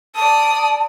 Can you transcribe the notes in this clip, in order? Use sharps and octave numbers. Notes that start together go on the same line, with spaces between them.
D5 A5 D#6